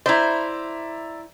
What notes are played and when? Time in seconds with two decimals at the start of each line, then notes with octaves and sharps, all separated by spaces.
0.06 E4 C5 D5 E5 A#5